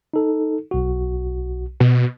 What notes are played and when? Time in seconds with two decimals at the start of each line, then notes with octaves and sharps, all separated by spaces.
0.14 D#4 A4
0.71 B1 F#4
1.80 B2